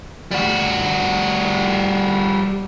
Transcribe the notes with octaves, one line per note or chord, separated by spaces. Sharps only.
G3 F#4